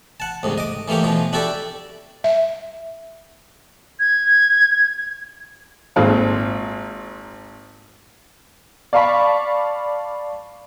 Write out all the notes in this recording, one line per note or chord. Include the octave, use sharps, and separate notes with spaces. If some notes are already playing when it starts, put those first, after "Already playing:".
F#5 A5
D2 G#2 C3
D#5 D6
E3 A3 A#3 G4 C#5
B2 E3 F3
D4 E4 F#4 G4 A4 D5
E5
G#6
G#1 A#2 G#4 A4 C5 F5
D5 F5 A5 B5 C#6 B6